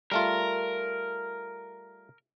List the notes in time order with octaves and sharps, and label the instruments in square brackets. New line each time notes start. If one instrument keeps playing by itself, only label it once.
[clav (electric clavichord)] G3 A3 F4 [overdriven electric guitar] A#4